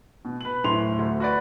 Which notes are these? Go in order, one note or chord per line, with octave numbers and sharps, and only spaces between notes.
B2
B4 F#7
D1 A2 C6 F7
D2
F#4 B4 D5